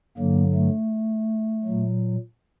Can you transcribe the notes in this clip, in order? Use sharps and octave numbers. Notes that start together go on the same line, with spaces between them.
G2 D3 F#3 A#3
A3
A#2 F#3